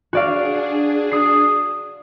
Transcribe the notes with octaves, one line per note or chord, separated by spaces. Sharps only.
D4 F#4 G#4 D5 F5
D#6 C7